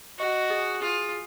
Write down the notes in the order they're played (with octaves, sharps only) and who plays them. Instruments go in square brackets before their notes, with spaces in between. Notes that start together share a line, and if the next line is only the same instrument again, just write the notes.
[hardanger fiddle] F#4 [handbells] D#5
[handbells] G#4
[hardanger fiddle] F4 [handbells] G#4